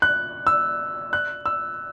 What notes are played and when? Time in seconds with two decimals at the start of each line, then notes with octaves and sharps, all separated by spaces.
0.02 F#6
0.47 E6
1.13 F#6
1.46 E6